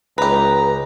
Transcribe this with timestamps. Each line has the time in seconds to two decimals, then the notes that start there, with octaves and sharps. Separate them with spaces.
0.18 C#2 G4 B4 A#5